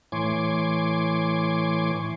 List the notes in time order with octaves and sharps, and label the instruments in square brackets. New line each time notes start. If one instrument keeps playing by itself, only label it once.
[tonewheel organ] A2 E3 C#5 G#5 C6 D6